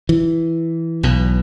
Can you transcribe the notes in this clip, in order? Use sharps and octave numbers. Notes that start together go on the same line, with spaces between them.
E3
B1 B2